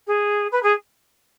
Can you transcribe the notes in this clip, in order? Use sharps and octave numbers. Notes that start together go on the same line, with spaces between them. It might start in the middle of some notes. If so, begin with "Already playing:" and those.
G#4
B4
G#4